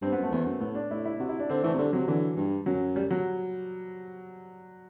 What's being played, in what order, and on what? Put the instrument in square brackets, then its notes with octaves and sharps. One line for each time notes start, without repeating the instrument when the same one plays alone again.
[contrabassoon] G2 [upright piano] C4
[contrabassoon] F#2 [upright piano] B3
[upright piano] A3
[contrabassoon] E2 [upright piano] B3
[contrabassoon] F#2
[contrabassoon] A2 [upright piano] B3
[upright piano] D4
[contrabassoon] A2 [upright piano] E4
[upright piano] E4
[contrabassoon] C3 [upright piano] F#4
[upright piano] E4
D4
[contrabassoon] D3 [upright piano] C4
[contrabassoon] E3 [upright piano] A3
[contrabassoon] C3
[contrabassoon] D3 [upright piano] G3
[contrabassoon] C3 [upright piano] F#3
[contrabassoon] D3 [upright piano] E3
[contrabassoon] G2
[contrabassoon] F#2 [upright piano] F#3
[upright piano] G3
F#3